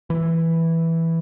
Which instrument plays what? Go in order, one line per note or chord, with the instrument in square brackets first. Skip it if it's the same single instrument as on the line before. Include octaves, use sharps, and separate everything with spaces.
[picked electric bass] E3